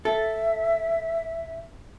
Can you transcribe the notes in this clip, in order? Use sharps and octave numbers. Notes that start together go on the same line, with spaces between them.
A4 E5